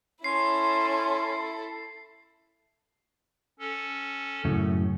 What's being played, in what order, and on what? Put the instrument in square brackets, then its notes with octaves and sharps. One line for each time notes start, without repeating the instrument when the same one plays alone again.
[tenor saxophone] C#4 [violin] E4 A4 [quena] C6 [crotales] C7
[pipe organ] C#4 A4
[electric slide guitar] F#2 A2 C#3